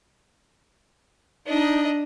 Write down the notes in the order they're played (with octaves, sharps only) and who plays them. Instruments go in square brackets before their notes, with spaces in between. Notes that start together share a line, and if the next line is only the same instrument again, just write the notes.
[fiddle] D4 D#5 [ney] D#4